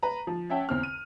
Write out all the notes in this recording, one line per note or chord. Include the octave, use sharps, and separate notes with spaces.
B4 A#5
F3
C#4 C#5 E5 F#5 G5 A5
E2 C4 F6
D#7